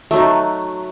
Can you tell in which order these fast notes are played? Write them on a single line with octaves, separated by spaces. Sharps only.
A3 F#3 D#4